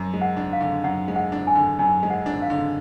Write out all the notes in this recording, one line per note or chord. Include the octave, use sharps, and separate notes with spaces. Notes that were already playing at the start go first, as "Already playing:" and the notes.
Already playing: F#2
G#3
F#5
D4
F5
D3
F#2 F#5
G#3
F#5
D4
G#5
D3
F#2 G#5
G#3
F#5
D4
F5
D3